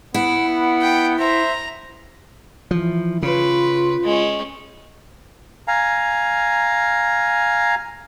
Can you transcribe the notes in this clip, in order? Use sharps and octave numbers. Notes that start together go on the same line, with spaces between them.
B3 E4 F#5
B3
G5
C5 E5 A#5
E3 F3
C#3 F4 B4
G#3 C#4
F5 G#5 A#5